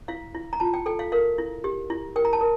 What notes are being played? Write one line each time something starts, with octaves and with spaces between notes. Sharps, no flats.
E4 F5
E4
A#5
F4 A5
G5
A4 G5
F5
A#4 F5
E4
G4
E4
A#4 G5
A#5
A5
A#4